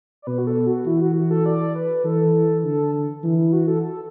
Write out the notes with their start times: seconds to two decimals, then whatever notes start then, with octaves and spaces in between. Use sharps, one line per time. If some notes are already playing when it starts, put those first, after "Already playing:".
0.22 D5
0.27 B2 B4
0.38 F#4
0.47 A4
0.67 F#4
0.86 E3 E4
1.01 F#4
1.16 F#4
1.31 A4
1.46 D5
1.75 B4
2.04 E3 A4
2.64 D3 A4
3.23 E3 E4
3.38 E4
3.52 F#4
3.67 A4
3.83 A4